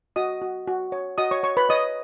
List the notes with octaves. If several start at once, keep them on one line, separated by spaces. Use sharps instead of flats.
F#4 D#5 D#6
F#4
F#4
C#5
F#4 D#5 D#6
C#5 C#6
C#5 C#6
B4 B5
C#5 D#5 D#6